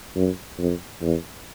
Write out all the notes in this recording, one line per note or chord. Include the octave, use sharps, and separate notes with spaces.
F#2
F2
E2